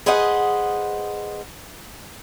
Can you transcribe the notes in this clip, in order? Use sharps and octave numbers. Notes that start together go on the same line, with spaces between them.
G#4 B4 C5 D#5 F#5